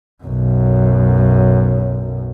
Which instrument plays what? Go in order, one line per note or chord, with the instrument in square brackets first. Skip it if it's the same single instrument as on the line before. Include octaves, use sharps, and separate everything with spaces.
[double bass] B1 F#2